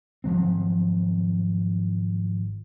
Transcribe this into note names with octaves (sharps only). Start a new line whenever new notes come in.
G#1 F3 F#3 C4